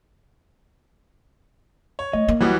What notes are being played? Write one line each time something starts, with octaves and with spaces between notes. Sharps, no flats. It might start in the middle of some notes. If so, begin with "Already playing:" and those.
C#5
A3 D#5
A#3
E3 F#3 G3 F#4 D#6